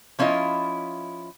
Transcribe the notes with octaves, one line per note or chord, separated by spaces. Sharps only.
F3 C#4 E4 F4 D#5